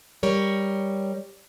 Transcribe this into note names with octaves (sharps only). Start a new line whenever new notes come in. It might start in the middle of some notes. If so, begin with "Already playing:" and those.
G3 A#4 C#5